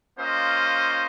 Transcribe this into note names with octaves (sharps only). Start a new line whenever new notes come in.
A#3 C#4 F4 C5 D#5